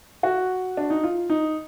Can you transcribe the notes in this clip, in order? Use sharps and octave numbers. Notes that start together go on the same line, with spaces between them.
F#4
D4
D#4
F4
D#4